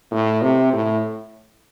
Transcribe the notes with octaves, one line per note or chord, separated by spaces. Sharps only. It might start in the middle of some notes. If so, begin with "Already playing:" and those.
A2
C3
A2